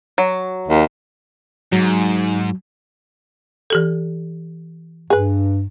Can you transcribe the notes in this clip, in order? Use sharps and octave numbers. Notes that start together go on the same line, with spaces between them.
F#3
D#2
G#2 F#3
E3 G4 A4
G2 G#4 B4